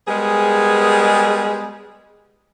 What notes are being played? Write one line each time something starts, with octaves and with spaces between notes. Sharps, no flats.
G3 G#3 B3 G#4 A#4